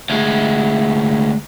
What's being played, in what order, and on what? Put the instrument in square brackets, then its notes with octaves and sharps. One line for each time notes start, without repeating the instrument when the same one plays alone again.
[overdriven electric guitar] D2 G#3